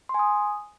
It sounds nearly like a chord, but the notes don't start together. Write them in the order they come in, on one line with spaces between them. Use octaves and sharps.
C6 G#5 D#6